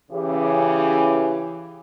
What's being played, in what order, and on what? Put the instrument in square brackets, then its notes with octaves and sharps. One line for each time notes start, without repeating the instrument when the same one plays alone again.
[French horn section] C#3 E3 G4